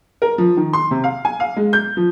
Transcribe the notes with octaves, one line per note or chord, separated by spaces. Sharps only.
A#4
F3
D#3
C6
C3
F5
G#5
F5
G#3
G6
F3